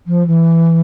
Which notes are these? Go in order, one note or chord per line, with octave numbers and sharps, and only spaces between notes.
F3
E3